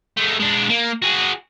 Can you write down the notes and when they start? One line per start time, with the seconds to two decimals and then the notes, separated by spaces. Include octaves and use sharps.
0.17 G#3 A3
0.40 G#3 D4
0.69 A#3
1.02 F#4 G#4